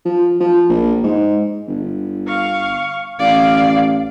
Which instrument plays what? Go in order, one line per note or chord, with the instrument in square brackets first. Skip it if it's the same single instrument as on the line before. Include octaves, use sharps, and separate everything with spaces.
[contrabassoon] F3
F3
A#1
G#2
G1
[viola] F5 C#6
[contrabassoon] A1 [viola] D5 [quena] F5